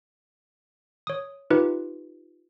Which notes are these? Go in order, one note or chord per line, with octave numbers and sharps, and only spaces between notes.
C#5 D#6
D#4 F4 G4 B4